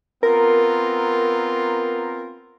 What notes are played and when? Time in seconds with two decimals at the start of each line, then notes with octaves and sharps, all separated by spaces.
0.23 B3 C4 F4 A#4